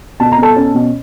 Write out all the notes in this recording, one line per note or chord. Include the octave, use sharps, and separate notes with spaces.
B2 A5
A#5
B2 A4 A5
C#4
B2